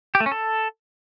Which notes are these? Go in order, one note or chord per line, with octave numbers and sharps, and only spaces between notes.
G4
A3
C#4
A4